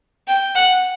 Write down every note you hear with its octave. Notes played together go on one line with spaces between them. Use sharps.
G5
F#5